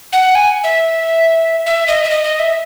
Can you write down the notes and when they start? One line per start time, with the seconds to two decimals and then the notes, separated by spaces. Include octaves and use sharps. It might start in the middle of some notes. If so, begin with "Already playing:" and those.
0.13 F#5
0.35 G#5
0.64 E5
1.66 E5
1.88 D#5
2.04 E5
2.10 D#5
2.24 D#5
2.39 E5